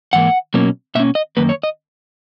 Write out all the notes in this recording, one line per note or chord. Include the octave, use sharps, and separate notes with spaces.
G#2 E3 A#3 F#5
B2 F#3 A#3 C#4
B2 A#3 C#4 E5
D#5
F#2 D#3 A#3 B4
C#5
D#5